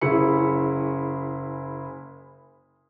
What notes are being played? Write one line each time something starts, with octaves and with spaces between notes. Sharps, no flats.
F#1 C#4 E4 G#4 B5 C#7